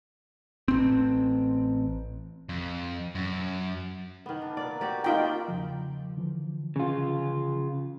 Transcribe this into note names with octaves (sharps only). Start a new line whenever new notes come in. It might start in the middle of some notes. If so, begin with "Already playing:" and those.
A1 C4
F2
F#2
D#3 B3
D4
A#2 A#4 D5
F#4 G4 D5
C3 A3 A#3 D#4 F4 G5
E2 C#3 F3
D3 E3 F3
C#3 F4